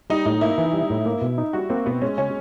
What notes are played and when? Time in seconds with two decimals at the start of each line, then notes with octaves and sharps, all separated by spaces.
0.10 G3 D#4
0.26 A2 D#4
0.41 A#3 E4
0.58 E3
0.73 G3
0.90 A2
1.06 A#3
1.22 B2
1.38 D#4
1.53 G3 F#4
1.70 A#3 C4
1.86 B2 B3
2.02 G#3 C#4
2.17 C#3 C#4